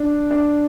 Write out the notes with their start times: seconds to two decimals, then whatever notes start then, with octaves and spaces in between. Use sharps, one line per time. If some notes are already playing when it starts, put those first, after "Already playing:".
Already playing: D4
0.31 D4